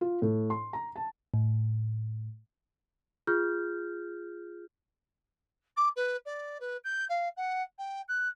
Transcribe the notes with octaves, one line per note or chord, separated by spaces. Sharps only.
F4
A2
C6
A#5
A5
A2
F4 G#4 F6 G6
D6
B4
D5
B4
G6
F5
F#5
G5
F#6